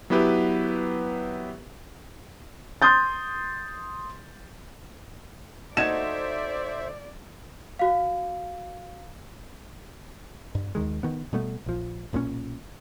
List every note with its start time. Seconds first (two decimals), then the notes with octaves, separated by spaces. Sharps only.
0.10 F#3 B3 E4 G4 B4
2.82 C6 D#6 G6 A6
5.77 A3 D#4 F#4 C5 D5 E5 G#6 E7
7.79 F#4 F5
10.55 G2
10.75 D#2 D#3 G#3
11.03 D#3 B3
11.33 B2 G3 A3 B3
11.66 A#1 F3
12.13 B1 A#2 E3 C#4